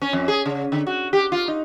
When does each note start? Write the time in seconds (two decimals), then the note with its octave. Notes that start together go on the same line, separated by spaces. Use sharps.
0.02 C#4
0.13 F2
0.28 G#4
0.46 C#3
0.72 D3
0.87 F#4
1.13 G4
1.32 F4
1.48 D#4